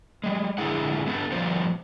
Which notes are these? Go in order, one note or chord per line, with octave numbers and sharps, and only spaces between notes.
G3 G#3
D3 G#3 E4 G#4 F#5
B3 D4 A4
F3 G3 B3 F4 C5